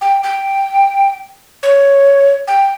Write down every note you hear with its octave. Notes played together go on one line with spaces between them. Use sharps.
G5
G5
C#5
G5